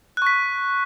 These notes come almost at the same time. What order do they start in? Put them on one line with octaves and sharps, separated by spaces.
F#6 C#6 B6